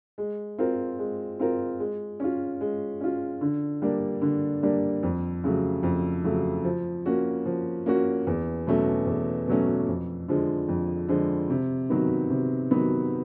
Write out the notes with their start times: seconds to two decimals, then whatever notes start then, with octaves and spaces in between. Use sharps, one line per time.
0.18 G#3
0.58 C4 F4 A#4
0.99 G#3
1.40 C4 F4 A#4
1.80 G#3
2.20 C#4 F4
2.61 G#3
3.01 C#4 F4
3.41 D3
3.82 G3 A#3 D4
4.22 D3
4.63 G3 A#3 D4
5.03 F2
5.44 C#3 F#3 A3
5.83 F2
6.24 C#3 F#3 A3
6.64 F3
7.06 A#3 C#4 F#4
7.45 F3
7.86 A#3 C#4 F#4
8.27 E2
8.67 B2 F#3 A3 C#4
9.07 E2
9.48 B2 F#3 A3 C#4
9.88 F2
10.28 D3 F3 G#3
10.68 F2
11.09 D3 F3 G#3
11.50 C3
11.90 D#3 F#3 B3
12.30 C3
12.71 D#3 F#3 B3